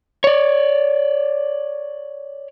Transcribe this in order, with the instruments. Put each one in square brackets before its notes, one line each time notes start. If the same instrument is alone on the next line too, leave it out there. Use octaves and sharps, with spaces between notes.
[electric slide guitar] C#5 D5